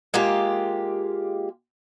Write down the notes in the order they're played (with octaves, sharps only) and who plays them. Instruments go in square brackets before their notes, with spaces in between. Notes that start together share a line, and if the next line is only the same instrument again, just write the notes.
[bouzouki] G#3 A#3 F4 G4